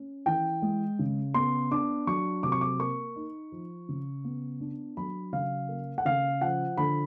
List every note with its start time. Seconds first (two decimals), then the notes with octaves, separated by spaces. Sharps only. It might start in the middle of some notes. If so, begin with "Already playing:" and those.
Already playing: C#4
0.26 E3 G5
0.62 G#3
0.99 C#3
1.34 B3 C6
1.71 D4 D6
2.07 F#3 C#6
2.43 C3 D6
2.52 C#6
2.61 D6
2.79 A#3 C#6
3.16 D#4
3.52 F3
3.89 C#3
4.24 B3
4.60 D4
4.97 F#3 B5
5.32 C#3 F5
5.69 A#3
5.98 F#5
6.05 C#3 F5
6.41 F3 F#5
6.78 D3 B5